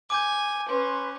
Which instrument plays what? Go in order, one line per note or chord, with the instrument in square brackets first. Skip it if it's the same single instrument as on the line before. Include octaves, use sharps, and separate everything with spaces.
[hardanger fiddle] G#5 [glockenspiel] D6 G6
[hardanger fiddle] C#4 [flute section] B4 C6